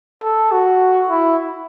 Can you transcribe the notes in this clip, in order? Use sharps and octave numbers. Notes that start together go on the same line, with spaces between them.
A4
F#4
E4